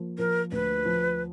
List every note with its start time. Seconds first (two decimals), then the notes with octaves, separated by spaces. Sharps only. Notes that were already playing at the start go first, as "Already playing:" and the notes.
Already playing: F3 A#3
0.18 F3 A#4
0.52 D2 B4
0.85 F3